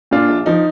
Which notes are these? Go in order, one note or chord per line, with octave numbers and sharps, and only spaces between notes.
A#2 D4 F4
A#1
F3 D#4